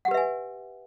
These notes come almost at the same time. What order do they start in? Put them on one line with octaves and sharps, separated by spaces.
F#5 G4 B4 E5 G#5